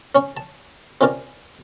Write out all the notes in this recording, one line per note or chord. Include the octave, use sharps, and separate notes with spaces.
C#4 C#5
A5
C3 C#4 F4 A#4 D5